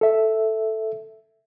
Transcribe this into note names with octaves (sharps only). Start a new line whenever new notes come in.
A4 E5